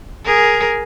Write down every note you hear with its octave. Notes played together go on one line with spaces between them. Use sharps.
G#4 A#4